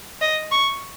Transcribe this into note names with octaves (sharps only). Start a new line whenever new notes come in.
D#5
C#6